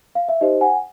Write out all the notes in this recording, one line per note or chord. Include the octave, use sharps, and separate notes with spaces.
F5
E5
D#4 G4 C5 D#5
F#5 G#5